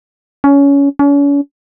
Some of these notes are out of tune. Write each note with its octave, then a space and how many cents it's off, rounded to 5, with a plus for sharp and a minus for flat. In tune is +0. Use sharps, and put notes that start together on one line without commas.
C#4 +20
C#4 +40